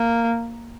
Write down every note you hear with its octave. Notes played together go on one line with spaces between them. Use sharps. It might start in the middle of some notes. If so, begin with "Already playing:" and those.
Already playing: A#3